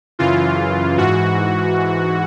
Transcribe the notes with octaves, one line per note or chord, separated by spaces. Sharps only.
F#2 C#3 E3 F4
G#2 E3 F#4